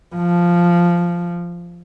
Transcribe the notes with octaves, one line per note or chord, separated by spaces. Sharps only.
F3